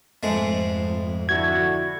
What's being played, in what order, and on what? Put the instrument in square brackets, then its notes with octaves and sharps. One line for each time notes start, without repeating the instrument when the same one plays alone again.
[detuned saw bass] F2 [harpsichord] G#2 G#3 A3
[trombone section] D3 E4 F#4 [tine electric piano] G#6